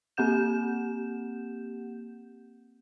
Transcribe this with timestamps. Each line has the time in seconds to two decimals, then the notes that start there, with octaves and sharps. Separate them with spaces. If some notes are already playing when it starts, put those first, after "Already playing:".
0.17 A#3 C4 G4 F#5 G6 E7